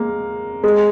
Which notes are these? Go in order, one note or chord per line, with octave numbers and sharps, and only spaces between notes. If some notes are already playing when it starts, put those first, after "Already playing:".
Already playing: G#3 A#3
G#3